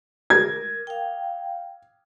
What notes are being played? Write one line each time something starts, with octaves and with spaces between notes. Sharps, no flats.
A#4 G#6
F5 G5